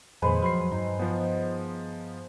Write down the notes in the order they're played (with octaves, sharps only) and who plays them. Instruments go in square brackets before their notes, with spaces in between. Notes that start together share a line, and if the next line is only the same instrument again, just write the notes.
[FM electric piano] F2 A#2 D#3 [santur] G#3 B4 C5
[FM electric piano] F3 [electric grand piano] F#3 C6 C7
[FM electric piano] G2 [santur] D#4
[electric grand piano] F3 B3 [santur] C5